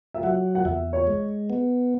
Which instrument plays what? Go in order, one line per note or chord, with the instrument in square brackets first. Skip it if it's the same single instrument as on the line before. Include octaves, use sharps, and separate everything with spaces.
[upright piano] E5
[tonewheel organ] F#3 [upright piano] F#5
[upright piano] F#5
[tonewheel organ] E2 [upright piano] E5
[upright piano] C#5
[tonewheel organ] G#3
B3